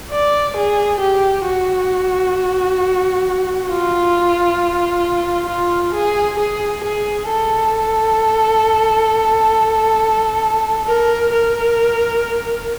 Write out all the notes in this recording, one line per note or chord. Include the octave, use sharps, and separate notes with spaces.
D5
G#4
G4
F#4
F4
F4
G#4
G#4
G#4
A4
A#4
A#4